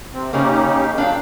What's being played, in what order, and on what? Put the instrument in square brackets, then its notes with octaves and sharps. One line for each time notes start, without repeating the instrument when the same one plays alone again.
[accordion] C3 C4
[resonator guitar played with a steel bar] C#3 A#3 [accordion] C#4 D#4 G4
[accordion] A#2 F#3 [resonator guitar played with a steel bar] D4 F5 G5